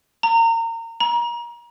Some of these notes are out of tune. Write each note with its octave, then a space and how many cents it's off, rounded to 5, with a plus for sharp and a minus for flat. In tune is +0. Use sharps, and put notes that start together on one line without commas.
A#5 -30
A#5 +30